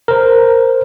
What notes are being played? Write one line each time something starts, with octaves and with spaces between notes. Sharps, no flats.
A#4 C5